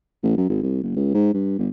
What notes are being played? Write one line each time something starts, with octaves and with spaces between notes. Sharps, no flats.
A1
F#2
G#1
C2
F#1
C#2
G#2
G2
G1